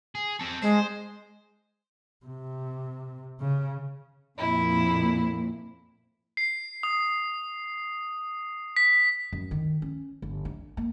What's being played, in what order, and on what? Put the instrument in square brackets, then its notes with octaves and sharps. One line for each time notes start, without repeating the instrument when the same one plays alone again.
[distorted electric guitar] G#4
C4 A4
[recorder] G#3 [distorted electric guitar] C5
[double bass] C3
C#3
[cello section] F2 A#2 A#3 [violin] E4
[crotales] C7
D#6
B6
[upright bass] F#2
D#3
C#4
G1
D4
A#3